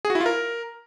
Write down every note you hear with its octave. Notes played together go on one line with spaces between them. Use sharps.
G#4
F#4
E4
F4
A#4